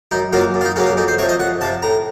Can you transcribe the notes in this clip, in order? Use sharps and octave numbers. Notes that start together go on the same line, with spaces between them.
F#2 D#4
C#3 F#3 A#3 F4
F#2
F4
D#4
C#3 F#3 A#3 C#4
C#4
F2 D#4
C5
C3 F3 C#5
D#5
F2 F#5
C3 F3 A5
A2 A#5